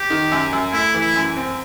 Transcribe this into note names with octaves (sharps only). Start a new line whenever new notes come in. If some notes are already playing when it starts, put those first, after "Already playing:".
Already playing: G4
D#3
F#2
F#2
A3 E4
E3
E4
F#2
C4